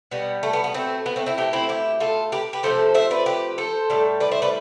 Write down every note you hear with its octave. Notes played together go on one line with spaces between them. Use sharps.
B2 G3 B3
A3
B3
B3
A3 C4
B3
A3 C4
C4 E4
B2 A3 E4 G4
C4 E4
E4 G4
F4 A4
G4 B4
G4 B4
C3 F3 A3 A4 C5
C5 E5
B4 D5
G4 B4
A4 C5
A2 G3
B4 D5
C5 E5
B4 D5